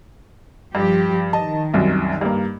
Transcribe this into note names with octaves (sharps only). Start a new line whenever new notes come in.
G2 F3 G4
D#3 D#5 A5
C2 F#2
G2 A#3